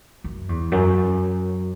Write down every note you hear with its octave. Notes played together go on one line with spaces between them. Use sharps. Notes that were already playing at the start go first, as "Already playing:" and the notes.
F#2
E2
F#2